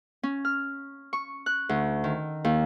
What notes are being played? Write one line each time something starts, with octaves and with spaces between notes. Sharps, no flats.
C#4
F6
C#6
F#6
D2
D#3
D#2